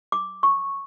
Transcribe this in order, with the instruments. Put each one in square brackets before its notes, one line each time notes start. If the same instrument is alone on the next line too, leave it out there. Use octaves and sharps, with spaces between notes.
[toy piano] D6
C#6